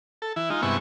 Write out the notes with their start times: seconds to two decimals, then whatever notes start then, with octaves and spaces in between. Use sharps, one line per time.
0.22 A4
0.36 E3 E4
0.50 G#3 D#4 F4
0.62 G2 C3 G#3 B3 E4 C#6